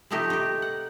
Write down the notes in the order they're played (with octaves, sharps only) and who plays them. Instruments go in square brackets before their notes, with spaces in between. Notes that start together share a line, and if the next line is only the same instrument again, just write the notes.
[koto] C3 F3 A3 D#4 G4
D#4 G4
F#5